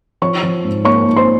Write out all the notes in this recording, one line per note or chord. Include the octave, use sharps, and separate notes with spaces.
F3 C#5 C#6
F3
G#2
A#3 C#5 C#6
A#3
C5 C6